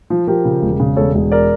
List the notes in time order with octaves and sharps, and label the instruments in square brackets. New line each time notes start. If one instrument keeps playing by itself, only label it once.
[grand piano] F3
F3 G4 A#4
C#3
E1
C#3
E1 A4 C#5
E1
A#4 D5